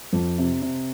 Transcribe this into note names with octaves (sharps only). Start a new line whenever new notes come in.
F2
C3
C3